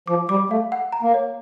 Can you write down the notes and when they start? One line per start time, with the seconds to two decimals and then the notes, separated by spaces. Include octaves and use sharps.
0.07 F3 D6
0.29 G3 D6
0.50 A3 F5
0.72 F#5
0.92 A#5
1.03 A#3
1.14 C#5